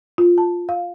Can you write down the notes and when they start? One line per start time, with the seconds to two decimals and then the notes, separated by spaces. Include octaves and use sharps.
0.18 F4
0.38 A5
0.69 F5